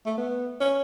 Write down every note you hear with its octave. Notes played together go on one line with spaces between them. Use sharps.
A3
B3
C#4